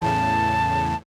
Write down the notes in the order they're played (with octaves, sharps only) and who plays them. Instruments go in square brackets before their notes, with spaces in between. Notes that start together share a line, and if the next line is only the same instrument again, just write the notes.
[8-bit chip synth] E2 A2 C#3 [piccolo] A5